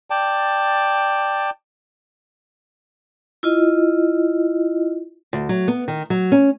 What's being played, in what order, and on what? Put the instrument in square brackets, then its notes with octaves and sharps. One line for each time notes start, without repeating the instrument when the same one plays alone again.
[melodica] D5 G5 A5
[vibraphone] E4 F4 D#5
[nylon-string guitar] D2
F#3
B3
D#3
F#3
C#4